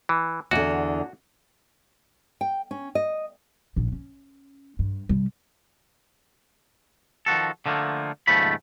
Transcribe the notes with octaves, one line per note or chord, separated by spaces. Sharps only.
E3
E2 D3 F#4
G5
C#4
D#5
A#1 C#3
C#4
G2
C3 G3
D#3 F3 F#4 A4
D3 F3 A3 A#3
D#2 G#2 C#3 F3 A3 B5